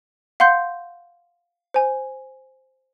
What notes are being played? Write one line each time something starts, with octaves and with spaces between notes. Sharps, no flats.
F5 F#5 C6 G6
C5 G#5